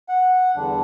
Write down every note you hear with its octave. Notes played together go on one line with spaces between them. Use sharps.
F#5
E2 D3 G3 D4